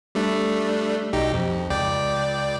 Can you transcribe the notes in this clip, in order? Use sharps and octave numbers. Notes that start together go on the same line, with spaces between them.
G3 A3 D4
B1 D#4 G4
F2
C#2 D5 G5